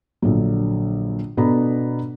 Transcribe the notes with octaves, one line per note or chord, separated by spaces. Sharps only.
A#1 D3 F#3
B2 B3 D4 A4 A#5 B5